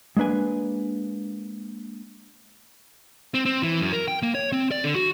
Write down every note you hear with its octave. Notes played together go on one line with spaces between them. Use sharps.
G#3 A#3 D4 B4 G#5
C4
C4
E3
F#2
A#4
G5
A#3
C#5
C4
D5
D3
F#4